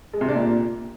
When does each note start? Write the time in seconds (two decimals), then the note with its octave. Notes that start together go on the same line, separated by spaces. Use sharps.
0.13 G#3
0.21 C3
0.28 D4
0.36 A#2